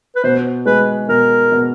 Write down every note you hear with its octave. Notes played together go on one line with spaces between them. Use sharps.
B4
B2 C5
G#3 B4
B2 A#4
B2